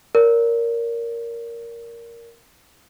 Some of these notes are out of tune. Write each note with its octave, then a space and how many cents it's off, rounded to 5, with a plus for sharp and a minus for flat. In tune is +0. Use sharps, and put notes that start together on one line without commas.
A#4 +0 D5 -45